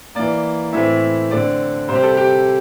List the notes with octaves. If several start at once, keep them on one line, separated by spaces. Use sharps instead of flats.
E3 A#3 D5
A2 E3 A3 C4 E5
D3 A3 C4 D5
C3 G3 C4 C5
G4
A4
G4